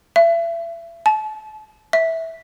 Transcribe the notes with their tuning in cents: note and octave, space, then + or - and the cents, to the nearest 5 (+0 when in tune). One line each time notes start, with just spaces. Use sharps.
E5 +35
A5 -35
E5 -10